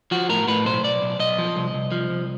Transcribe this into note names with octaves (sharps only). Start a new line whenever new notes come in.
F3 F#4
A2 A#4
A2 B4
B1 C5
B1 D5
B1
B1 D#5
F3
C2
C2
F3
C2